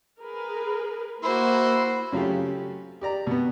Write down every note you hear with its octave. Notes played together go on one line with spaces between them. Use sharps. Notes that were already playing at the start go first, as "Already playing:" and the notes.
G#4 A#4 B4
A#3 E4 F#4 C5 C6
C#3 F#3 A3 F4 G4
G4 D5 A#5
B2 B3